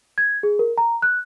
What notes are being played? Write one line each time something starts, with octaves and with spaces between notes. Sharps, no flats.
G#6
G#4
A#4
A#5
F#6